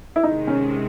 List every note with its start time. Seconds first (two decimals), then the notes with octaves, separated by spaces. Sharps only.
0.16 E4
0.23 C3 D#3 G#3 D#4
0.47 C#4